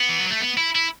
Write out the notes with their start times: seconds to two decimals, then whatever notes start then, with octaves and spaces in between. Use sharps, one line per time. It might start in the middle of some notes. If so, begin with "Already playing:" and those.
Already playing: B3
0.09 E3
0.20 F#3
0.31 A3
0.41 B3
0.57 E4
0.75 E4